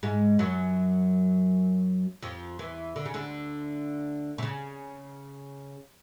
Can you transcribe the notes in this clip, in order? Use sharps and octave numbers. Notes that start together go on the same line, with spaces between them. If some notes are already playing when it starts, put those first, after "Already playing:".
G#2 G#3
F#2 F#3
F2 F3
E2 E3
D3
C#3
D2 D3
C3
C#3